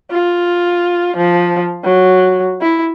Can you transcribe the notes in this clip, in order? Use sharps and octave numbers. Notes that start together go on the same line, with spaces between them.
F4
F3
F#3
E4